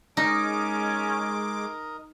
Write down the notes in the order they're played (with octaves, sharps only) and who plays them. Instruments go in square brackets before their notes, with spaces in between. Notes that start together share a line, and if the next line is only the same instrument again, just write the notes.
[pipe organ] G#3 D6 [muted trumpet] C#4 [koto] D#4 [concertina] A#4 D#5